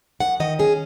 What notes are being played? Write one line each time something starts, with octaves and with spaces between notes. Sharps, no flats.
F#2 F#5
D#3 D#5
C#4 G#4